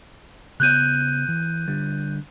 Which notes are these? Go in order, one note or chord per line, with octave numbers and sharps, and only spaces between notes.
C#3 B3 F#6 G6 D#7
E3
D3 G3